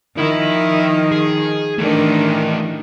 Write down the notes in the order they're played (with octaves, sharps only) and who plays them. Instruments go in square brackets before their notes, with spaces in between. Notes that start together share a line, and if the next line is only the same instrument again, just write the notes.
[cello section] D#3 F3 [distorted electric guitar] E4
[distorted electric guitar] G#4
[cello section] D#3 D4 [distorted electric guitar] E3 A3